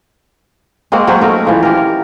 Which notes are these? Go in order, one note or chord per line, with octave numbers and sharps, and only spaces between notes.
G#3 A#3 C4 F#4
F#3 C#4 C5 F#5
F#3 A3 D#4 A#4
E3 F3 G#3
G4 A#4